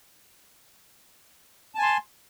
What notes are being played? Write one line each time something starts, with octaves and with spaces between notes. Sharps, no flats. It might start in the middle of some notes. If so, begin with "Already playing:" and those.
G#5 A5 C6